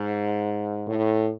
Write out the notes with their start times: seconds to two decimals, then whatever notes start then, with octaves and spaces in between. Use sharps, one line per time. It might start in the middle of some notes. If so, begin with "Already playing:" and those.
Already playing: G#2
0.86 A2